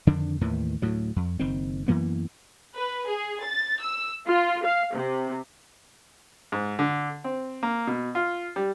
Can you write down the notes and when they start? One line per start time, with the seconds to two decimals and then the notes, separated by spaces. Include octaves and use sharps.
0.07 F2 D3 D#3 D4
0.41 D#2 A2 D#3 E3
0.82 D2 A2 F#3
1.16 F2
1.40 F#1 D#3 C4
1.88 F#2 E3 A#3 B3
2.75 B4
3.09 G#4
3.44 A6
3.82 E6
4.27 F4
4.64 F5
4.94 C3
6.52 G#2
6.79 D3
7.24 C4
7.63 A#3
7.87 B2
8.15 F4
8.56 G3